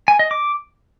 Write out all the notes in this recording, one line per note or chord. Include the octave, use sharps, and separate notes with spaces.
G#5
D#5
D6